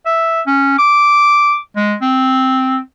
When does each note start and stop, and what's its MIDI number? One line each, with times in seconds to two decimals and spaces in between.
0.06 0.41 76
0.47 0.76 61
0.78 1.56 86
1.76 1.94 56
2.02 2.78 60